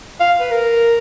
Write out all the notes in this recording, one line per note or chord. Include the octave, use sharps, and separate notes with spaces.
F5
B4
A#4